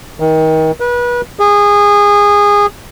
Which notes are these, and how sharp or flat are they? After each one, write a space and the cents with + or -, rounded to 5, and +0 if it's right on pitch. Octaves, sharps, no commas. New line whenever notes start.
D#3 +30
B4 -30
G#4 -20